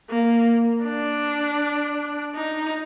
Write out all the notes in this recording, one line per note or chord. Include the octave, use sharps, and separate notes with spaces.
A#3
D4
D#4